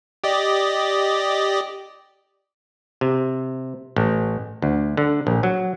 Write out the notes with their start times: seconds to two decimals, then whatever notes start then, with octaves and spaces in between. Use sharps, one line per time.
0.24 G4 D5 D#5
3.01 C3
3.96 A1
4.62 D2
4.97 D3
5.27 A#1
5.43 F#3